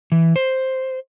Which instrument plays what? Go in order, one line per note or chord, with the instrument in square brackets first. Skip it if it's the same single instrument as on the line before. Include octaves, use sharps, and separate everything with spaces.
[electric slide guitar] E3
C5